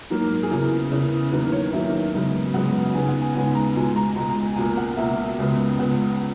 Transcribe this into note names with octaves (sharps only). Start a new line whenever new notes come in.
G#2 F#3 A#3
G#4
E2 C#3 E3 A#4
E2 C#3 E3
E2 D#3 F#3 A#3 B4
C#5
E2 D#3 F#3 A#3 E5
F#2 C#3 G#3 B3
F#2 C#3 G#3 B3 F#5
D#2 C#3 G#3 B3 G#5
F#5
G#5
D#2 C#3 G#3 B3 G#5
A#5
C#2 B2 G#3 G#5
A#5
C#2 B2 G#3 A#5
A#5
G#5
C#2 B2 A#3 G#5
F#5
C#2 B2 A#3 E5
C#2 C#3 G#3 B3
C#2 C#3 G#3 B3 F#5